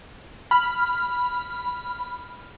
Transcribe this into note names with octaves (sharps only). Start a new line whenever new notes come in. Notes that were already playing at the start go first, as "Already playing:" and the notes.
B5 F6